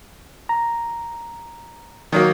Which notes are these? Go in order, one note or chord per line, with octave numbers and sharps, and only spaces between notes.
A#5
D#3 F#3 A#3